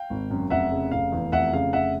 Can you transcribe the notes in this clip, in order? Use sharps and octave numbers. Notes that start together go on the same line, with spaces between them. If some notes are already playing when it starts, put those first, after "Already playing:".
Already playing: F5 G5
G#1
F#2
F1 E5 F#5
C#3
F1 F5
E2
F1 E5 F#5
C#3 F5
F1 E5 F#5